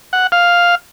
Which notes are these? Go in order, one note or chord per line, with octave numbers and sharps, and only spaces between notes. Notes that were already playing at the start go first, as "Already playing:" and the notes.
F#5
F5